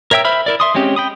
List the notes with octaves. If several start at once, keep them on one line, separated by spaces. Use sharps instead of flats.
A#4 C#5 E5 G5 E6
C5 E5 B5 F6
E4 A#4 D5
E5 C6 D#6
G#3 C4 C#4 G4
G5 B5 D#6